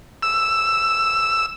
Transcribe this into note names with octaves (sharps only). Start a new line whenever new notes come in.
E6